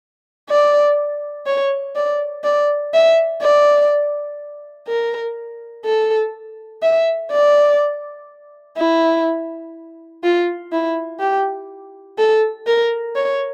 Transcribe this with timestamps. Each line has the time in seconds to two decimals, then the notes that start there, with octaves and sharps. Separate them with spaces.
0.49 D5
1.46 C#5
1.95 D5
2.44 D5
2.93 E5
3.42 D5
4.88 A#4
5.85 A4
6.83 E5
7.31 D5
8.77 E4
10.23 F4
10.72 E4
11.20 G4
12.18 A4
12.66 A#4
13.16 C#5